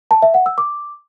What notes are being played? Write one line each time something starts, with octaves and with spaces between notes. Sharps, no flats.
A5
E5
F#5
E6
D6